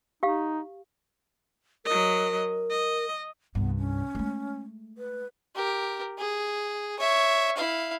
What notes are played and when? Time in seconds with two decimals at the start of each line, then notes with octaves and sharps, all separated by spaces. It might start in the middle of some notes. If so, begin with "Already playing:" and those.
0.23 D#4 G4 F5
1.85 F#3 A#4 D#5
2.70 D#5
3.55 C2 G2 B3
3.78 C#4
4.15 G#3 A3
4.98 B4
5.56 G4 A#4
6.18 G#4
6.99 C#5 E5
7.57 E4 F5